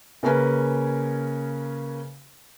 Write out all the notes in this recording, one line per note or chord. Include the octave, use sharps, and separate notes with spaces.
C#3 A#3 C#4 A#4 B4 G#5